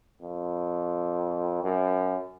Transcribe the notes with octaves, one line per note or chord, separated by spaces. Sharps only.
F2
F#2